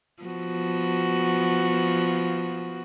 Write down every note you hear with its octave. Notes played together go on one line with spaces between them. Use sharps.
F3 B3 F#4